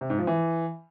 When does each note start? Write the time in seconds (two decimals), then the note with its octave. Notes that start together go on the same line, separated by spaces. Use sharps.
0.01 C3
0.10 G#2
0.19 F3
0.27 E3